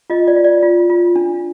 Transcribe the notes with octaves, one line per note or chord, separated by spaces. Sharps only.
F4 D#5
D5
F4
D5
F4
F4
D4